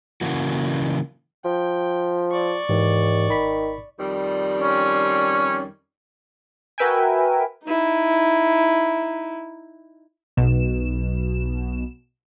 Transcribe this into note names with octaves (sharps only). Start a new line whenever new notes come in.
C#3 E3 F#3 A#3 F#4
F3 G5
D5 C#6
D#2 G#2 E3
G#1 D#3 B5 B6
F2 D#3 G3
C#4
F#4 A#4 B4 E5 G5 G#5
D#4 E4
B1 B2 E7